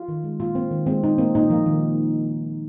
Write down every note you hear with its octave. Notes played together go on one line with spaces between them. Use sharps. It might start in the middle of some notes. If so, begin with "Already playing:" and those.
Already playing: F4
D#3
G#3
A#2 F4
A#3 C4
D#3
G#3 C4
A#2 D#4
A#3 C4
A#2 D#4
F3 A#3
D#3